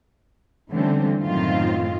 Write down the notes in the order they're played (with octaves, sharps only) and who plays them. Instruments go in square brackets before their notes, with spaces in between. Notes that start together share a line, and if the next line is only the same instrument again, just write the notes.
[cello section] D3 E3 G3 A3 C4 C#4
F#2 A2 D#3 C4 F4 F5